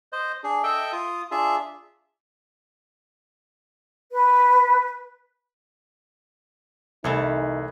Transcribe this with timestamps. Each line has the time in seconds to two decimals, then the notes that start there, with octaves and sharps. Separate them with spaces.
0.12 C5 D#5
0.44 D4 G#4
0.63 A4 D#5 E5 G5
0.92 F4 D#6
1.31 D4 F4 G#4 E5
4.12 B4
7.04 C2 E3 A3 D#4 C#5